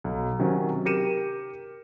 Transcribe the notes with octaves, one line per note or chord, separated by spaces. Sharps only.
B1
C3 D#3 F#3 C#4
G4 A#4 C#7 D#7 E7